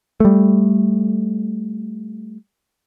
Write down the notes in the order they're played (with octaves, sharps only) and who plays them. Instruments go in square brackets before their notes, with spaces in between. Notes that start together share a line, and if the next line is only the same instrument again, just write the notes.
[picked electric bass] G3 A3